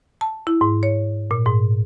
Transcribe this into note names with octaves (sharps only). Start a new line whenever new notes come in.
A5
E4
G#2
C#5
A#2
G#2